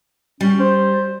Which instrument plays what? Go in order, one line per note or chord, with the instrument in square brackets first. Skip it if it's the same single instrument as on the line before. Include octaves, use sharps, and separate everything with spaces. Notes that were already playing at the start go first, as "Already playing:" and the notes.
[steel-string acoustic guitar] G3 [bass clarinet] C#4
[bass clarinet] C5